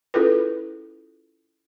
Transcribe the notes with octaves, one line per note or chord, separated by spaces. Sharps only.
C#4 E4 F4 G#4 A4 B4